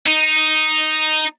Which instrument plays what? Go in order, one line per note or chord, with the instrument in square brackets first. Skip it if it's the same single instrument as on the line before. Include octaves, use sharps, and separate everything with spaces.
[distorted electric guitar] D#4